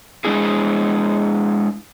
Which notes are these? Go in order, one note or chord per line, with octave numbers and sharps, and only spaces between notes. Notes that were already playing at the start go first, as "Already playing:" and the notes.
G#3 D4 E4 G#4